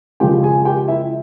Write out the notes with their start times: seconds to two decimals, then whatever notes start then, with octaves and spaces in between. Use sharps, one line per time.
0.20 C#3 F3 G#3 G4 G5
0.43 G#4 G#5
0.65 G4 G5
0.88 E4 E5